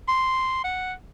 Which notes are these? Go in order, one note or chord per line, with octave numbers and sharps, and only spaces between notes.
C6
F#5